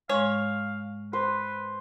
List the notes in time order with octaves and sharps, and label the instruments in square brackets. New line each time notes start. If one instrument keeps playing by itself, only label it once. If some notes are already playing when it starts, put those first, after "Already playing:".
[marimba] G#2 G#3 [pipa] C#5 [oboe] F5
[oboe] B4 [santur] C5